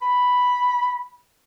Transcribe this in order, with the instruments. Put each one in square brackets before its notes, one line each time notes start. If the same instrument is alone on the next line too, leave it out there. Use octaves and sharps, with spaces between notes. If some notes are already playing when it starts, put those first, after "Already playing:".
[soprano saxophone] B5